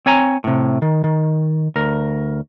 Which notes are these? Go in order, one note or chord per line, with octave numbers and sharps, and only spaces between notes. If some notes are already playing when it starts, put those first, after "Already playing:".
C4 C#5 G#5 A#5
A2 C3
D#3
D#3
D2 A#4